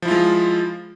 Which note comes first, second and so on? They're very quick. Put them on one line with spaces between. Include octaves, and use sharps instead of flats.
F3 E4 F4 G#3